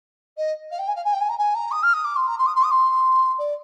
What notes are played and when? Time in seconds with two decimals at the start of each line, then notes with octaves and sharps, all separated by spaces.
0.37 D#5
0.71 F5
0.78 G5
0.87 G#5
0.95 F5
1.04 G#5
1.13 G5
1.20 G#5
1.29 A#5
1.38 G#5
1.54 A#5
1.71 D#6
1.83 F6
1.93 D#6
2.04 D6
2.16 C6
2.27 A#5
2.38 C6
2.46 D#6
2.55 C6
2.63 D#6
2.71 C6
3.38 D5